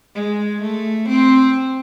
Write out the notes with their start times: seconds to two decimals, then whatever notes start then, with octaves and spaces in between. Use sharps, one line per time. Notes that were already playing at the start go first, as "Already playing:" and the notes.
0.15 G#3
0.61 A3
1.08 C4